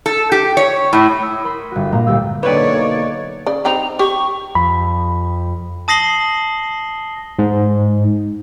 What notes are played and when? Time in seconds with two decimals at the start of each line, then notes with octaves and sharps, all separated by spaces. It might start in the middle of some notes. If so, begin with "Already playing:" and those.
0.06 A4
0.32 G4
0.57 C#5
0.93 A2
1.22 D#6 E6 G#6
1.44 A#4 B5 C6
1.72 G1 F#4
1.92 A#2 G#3 A#3 A#5 C6 E7
2.07 G1 D2 G4 E6
2.43 B1 D3 A#3 D#4 B4 C#5 D5
3.47 C#3 D5
3.65 G3 C4 D#4 A#5
3.99 G4 G5 C#6
4.55 F2 B5
5.88 A5 D#6 A#6 C7 F#7 G7
7.39 G#2